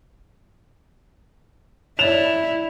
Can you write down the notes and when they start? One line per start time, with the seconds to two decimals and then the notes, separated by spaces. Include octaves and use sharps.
1.99 E4 C#5 D5 E7 F7